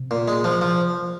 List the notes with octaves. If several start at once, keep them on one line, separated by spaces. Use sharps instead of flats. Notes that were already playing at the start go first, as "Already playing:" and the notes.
Already playing: C3
A#2
G#3
F3
F3